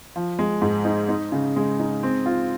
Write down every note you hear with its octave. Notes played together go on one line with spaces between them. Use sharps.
F3
G#3
G#2
D#4
D#4
C#3
G#3
D#4
C4
F4